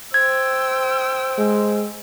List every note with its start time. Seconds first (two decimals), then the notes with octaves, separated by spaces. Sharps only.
0.14 C5 G5 E6 G#6
1.38 G#3